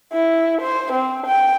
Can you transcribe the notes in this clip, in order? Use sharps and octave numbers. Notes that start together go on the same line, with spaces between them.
E4
C5
C4
G5